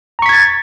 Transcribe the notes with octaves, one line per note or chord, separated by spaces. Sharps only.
A#5 C#6 G#6 A6 B6